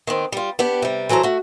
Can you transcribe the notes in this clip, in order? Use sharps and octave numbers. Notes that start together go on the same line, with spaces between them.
D#3 B3 C4
G3 F4
B3 D4 G4
C3 G3
E3 F#3 A4 C5 A#5
A3 F#4